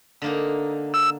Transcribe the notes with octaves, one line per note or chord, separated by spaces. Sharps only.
D3 A#3 D#4
E6